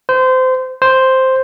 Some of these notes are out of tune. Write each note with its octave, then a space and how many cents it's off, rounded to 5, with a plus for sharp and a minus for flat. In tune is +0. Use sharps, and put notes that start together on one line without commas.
C5 -25
C5 +0